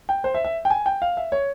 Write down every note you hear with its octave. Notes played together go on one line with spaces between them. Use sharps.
G5
C5
E5
E5
G5
G#5
G5
F5
E5
C#5